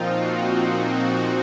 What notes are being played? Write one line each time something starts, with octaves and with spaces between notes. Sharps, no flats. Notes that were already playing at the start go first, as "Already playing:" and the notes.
Already playing: A#2 F3 C4 D#4 F4
F#4
A#2 F3 C4 D#4
F#4